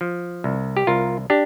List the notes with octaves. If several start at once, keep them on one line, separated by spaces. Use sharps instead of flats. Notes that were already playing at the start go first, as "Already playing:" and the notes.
F3
C2
G4
C2 F4 A#4
D4 G4